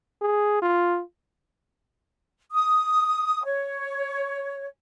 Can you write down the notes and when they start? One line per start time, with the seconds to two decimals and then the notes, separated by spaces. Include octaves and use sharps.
0.22 G#4
0.62 F4
2.52 D#6
3.45 C#5